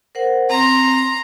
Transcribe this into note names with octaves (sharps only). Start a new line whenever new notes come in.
A#4 C5 F#5
C4 A#5 C6